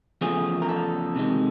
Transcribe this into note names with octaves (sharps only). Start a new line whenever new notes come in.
E2 C#3 F3 A3 G#4
A#4
A4
C3 D#3 G#3